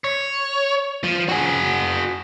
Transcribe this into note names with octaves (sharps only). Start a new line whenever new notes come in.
C#5
F3
F#4 G#4